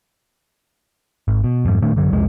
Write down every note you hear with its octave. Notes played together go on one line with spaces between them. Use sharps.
G#1
B2
F2 G#2
A#2 D#3 A3 D4
F#2 D3 F#3
C2 F2 G#3